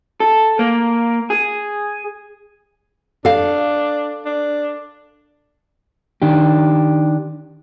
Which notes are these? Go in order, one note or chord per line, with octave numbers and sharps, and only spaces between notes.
A4
A#3
G#4
D4 A4 F5
D4
D#3 D4 G4